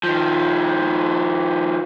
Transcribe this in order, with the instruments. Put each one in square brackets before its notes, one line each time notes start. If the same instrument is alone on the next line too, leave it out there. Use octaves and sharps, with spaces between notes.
[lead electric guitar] D#3 F3